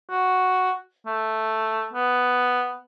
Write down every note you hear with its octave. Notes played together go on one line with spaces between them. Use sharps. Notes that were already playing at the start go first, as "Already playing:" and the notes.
F#4
A3
B3